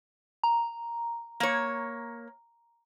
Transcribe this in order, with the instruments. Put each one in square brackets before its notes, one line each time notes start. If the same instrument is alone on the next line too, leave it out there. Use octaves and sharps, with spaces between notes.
[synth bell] A#5
[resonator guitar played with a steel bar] A#3 C#5